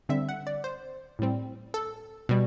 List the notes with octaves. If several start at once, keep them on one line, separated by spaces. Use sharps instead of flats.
D3 G3 C4 E5
F#5
D5
C5
A2 G3 C4
A4
B2 G3